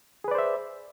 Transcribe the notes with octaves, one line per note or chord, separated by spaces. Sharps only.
G#4 B4 C5 D5 E5